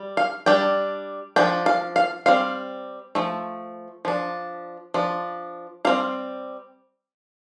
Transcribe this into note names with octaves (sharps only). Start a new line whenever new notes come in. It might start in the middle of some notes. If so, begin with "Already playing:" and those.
Already playing: G3
F5
G3 D4 G5
F3 D4 G5
F5
F5
G3 C4 F5
F3 A3
F3 D4
F3 D4
G3 C4 F5